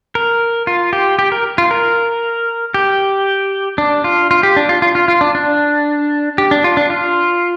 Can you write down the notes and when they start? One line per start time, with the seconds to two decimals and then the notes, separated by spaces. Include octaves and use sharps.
0.15 A#4
0.67 F4
0.93 G4
1.19 G4
1.32 A#4
1.58 F4
1.71 A#4
2.74 G4
3.78 D4
4.04 F4
4.31 F4
4.43 G4
4.57 D4
4.69 F4
4.82 F4
4.95 F4
5.08 F4
5.21 D4
5.35 D4
6.38 G4
6.51 D4
6.64 F4
6.77 D4
6.90 F4